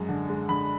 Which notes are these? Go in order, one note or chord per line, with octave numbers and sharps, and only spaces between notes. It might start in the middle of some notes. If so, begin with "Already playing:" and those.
Already playing: F#2 G#3
D3
G#3
D3 B5